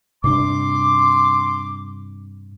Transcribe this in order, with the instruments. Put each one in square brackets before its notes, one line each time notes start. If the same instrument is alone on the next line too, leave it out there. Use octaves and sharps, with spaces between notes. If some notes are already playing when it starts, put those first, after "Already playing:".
[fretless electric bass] G2 C3 D4 [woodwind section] C6 D6